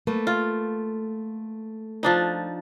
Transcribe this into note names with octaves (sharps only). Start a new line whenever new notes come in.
A3 A#3 B4
F4
F3 D4 D#4